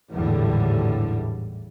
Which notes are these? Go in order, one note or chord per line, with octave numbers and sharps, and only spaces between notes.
G#1 E2 A2 D3 G3